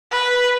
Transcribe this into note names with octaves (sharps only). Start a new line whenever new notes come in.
B4